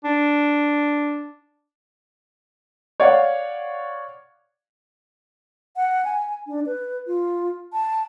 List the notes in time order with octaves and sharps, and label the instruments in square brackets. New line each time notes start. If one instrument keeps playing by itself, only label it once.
[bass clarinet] D4
[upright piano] C#5 D5 F5 F#5
[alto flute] F#5
G#5
D4
B4
F4
A5